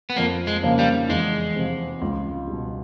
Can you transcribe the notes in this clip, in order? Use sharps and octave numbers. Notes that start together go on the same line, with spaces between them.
B3
F2 A#3
G#3
C#3 F3 A#3
G3
E2 G#3
C3 F3
C#2
B2 G3